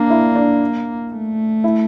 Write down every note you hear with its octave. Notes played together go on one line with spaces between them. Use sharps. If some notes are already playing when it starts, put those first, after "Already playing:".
Already playing: A#3 D4
E4
D4
A3
E4